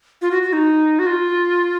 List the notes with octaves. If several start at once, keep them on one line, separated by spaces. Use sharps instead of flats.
F4
F#4
F#4
D#4
F#4
F4